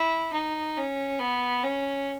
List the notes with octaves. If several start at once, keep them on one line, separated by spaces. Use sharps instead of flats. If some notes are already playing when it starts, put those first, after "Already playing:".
Already playing: E4
D#4
C#4
B3
C#4